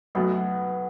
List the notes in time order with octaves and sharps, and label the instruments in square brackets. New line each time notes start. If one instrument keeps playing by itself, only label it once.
[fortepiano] B1 B2 A3 [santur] B3